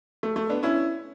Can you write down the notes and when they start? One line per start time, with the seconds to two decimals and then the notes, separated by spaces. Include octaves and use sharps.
0.23 A3
0.36 A3
0.49 B3 D4
0.63 C#4 E4